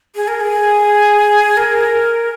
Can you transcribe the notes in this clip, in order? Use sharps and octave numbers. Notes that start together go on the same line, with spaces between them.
G#4
A#4
G#4
A#4